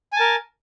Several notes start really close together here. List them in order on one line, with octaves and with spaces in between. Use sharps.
G#5 A5 A#4